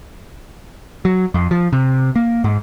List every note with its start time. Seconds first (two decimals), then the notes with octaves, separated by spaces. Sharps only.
1.05 F#3
1.34 F2
1.51 F3
1.73 C3
2.16 A#3
2.44 G#2